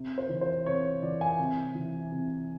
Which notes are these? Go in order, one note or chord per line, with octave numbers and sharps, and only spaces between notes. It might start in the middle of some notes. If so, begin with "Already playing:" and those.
Already playing: C3
C5
E3
C5
C3 C#5
E3 D5
G#5
C3
E3
C3